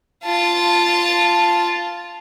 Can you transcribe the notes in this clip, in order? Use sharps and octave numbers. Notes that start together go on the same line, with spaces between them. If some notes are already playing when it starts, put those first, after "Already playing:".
F4 A5